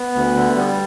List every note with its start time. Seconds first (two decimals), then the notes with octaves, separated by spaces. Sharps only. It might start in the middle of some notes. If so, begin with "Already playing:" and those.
Already playing: B3
0.15 D2
0.36 D3
0.56 G3